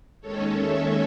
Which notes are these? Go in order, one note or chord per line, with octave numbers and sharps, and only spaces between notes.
D#2 D#3 G#3 C#4 A4 C#5
C#5 E5